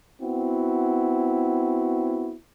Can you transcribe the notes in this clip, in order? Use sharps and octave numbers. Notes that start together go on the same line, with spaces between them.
B3 C4 E4 F#4